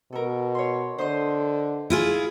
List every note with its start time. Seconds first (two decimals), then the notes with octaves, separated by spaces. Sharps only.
0.13 B2 A4 A#4
0.55 C#5 C6
0.98 D3 C5 D#5 C6
1.90 E4 F4 G#4